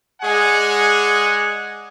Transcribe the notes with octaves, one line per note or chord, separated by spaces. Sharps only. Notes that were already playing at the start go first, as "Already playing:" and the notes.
G#3 G#4 D5 F#5 G#5